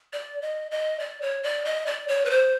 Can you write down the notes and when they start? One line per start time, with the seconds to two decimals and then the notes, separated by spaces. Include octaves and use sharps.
0.13 D5
0.42 D#5
0.71 D#5
1.00 D5
1.22 C#5
1.43 D5
1.65 D#5
1.86 D5
2.08 C#5
2.25 B4
2.30 C5